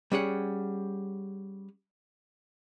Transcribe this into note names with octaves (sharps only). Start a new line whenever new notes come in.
G3 C#4 G#4 F#5